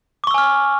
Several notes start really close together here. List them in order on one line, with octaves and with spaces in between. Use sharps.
D6 C#6 E6 G#5 F6